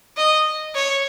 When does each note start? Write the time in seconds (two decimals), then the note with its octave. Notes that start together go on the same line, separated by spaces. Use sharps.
0.17 D#5
0.75 C#5